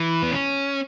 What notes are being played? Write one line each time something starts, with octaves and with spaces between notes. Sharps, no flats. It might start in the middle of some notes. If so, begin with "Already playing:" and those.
Already playing: E3
B3
C#4